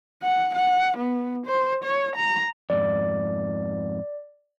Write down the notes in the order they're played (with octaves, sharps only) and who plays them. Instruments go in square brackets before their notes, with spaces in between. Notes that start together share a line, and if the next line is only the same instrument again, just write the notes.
[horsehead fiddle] F#5
F#5
B3
C5
C#5
A#5
[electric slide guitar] F2 G#2 [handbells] D5